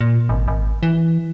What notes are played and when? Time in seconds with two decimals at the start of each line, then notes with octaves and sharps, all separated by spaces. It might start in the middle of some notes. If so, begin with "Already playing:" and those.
0.01 A#2
0.29 G#1
0.48 G#1
0.83 E3